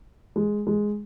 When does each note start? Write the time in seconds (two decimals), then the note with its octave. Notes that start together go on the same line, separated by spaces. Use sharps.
0.36 G#3
0.67 G#3